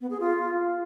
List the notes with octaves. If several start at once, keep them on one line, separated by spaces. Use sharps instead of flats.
B3
G#4
F4